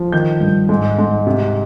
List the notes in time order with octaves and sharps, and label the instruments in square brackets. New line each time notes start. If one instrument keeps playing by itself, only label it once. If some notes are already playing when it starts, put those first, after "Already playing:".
Already playing: [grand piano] F3
D#3 G6
G2
G#2
G#2
C3